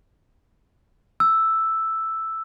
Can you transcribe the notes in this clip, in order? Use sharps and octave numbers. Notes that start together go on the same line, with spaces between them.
E6